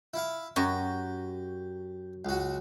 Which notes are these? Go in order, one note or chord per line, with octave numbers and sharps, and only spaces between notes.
E4 F5
F#2 F#4 G4
C#2 F#4